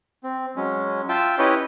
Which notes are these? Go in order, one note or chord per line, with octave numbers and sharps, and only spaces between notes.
C4
F#3 G#3 C#4
F4 E5 G5 A5 E6
C#4 E4 G4 B4 C#5 D#5